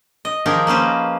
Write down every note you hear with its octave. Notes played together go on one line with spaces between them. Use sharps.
D#5
D#3 F3 G4 G#4 A#4 D#5
A#3 C#4 B4 C5